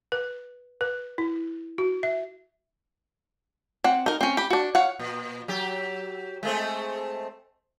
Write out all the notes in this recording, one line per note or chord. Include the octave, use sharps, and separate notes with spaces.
B4
B4
E4
F#4
E5
C4 F#5
D#4 A#4
C4 C#4
G4 B5
D4 F#4
C#5 F5 F#5
A#2
F#3 G4
G#3 A3 C4